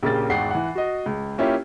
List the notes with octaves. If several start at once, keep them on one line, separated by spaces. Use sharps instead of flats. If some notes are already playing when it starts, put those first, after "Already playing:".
A#1 C#3 A#3 G4 A6
G#1 E2 F#5 G5 C7
E3 F#5
F#4 D#5
C#2
A#3 C#4 E4 F4 G4